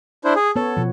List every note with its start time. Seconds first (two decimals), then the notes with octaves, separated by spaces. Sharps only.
0.24 D4 E4 C5
0.36 G#4
0.56 B3 A4 C#5
0.77 B2 F3